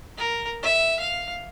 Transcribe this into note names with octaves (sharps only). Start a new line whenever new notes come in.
A#4
E5
F5